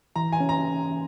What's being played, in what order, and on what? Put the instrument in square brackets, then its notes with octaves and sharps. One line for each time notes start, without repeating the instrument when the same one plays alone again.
[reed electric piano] E3 [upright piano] A#5
[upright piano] G#5
[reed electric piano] C#4
[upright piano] A#5